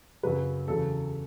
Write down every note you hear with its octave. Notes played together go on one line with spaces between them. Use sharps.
F#2 C#3 F#3 B4
E2 C#3 F#3 A4